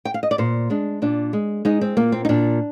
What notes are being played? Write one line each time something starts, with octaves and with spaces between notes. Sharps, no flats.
G5
F5
D#5
D5
A#2 C5
G#3 D4
A#2 D4
G#3
G#3 D#4
C4
A#2 A#3
C4
D#4
A#2 D4